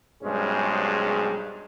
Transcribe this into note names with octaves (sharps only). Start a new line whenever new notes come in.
B1 G2 G#3 C#4 G#4 C5